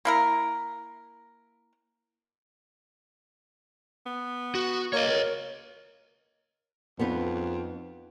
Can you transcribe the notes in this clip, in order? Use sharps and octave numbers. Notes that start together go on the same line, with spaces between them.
A#3 E4 A#4
B3
F#4
A#3 C#5 D#5
A#4
F2 B3 D#4 B4